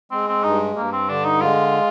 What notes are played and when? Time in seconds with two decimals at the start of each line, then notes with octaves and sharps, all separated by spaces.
0.11 G#3 C4
0.28 C4
0.44 G2 D#4
0.76 G2 A#3
0.93 C4
1.09 D3 D4
1.25 D#4
1.41 G#3 F4